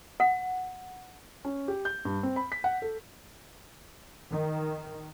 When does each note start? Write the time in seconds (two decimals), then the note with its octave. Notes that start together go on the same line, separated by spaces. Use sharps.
0.20 F#5
1.45 C#4
1.68 G4
1.85 G6
2.05 G2
2.23 C4
2.36 B5
2.52 B6
2.64 F#5
2.82 A4
4.30 D#3